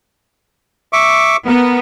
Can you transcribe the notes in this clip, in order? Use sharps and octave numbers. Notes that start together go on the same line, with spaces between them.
E5 C#6 D6
B3 A#4